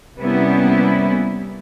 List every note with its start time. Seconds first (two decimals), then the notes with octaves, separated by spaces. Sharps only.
0.18 C3 G3 A#3 B3 C#4 E4